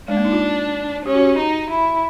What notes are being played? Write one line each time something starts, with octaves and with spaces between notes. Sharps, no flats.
G#3 D4
A#3
D#4
F4
C#4 G4
F#4
G4
D#4
E4